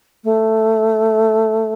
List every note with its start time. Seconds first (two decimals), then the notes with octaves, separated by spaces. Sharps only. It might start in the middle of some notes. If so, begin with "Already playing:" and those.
0.24 A3